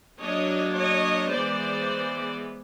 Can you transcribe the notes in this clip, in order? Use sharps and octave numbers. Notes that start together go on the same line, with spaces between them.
F#3 A#3 D4 C#5 D#5
C#5 D#5
E3 G#3 B3 C5 D5